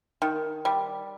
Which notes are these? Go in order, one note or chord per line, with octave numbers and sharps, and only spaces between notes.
D#3
G3